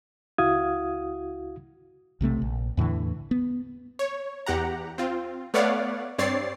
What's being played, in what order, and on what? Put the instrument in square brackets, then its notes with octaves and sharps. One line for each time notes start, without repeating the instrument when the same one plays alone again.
[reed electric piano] C#2 E4 F#4 F5 D#6 G#6
[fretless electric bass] B1 C3 A3 C4
A#1
E2 A2 D3 E3
B3
[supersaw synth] C#5
E2 G4 F#5 A#5
C4 F4
A3 B3 C#5 D5 F5 F#5
G2 C4 C#5 D5 A6 C7